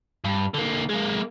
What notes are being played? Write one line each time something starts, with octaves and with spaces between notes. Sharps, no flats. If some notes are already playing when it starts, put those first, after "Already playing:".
G2
D3 A#3
G#3 A#3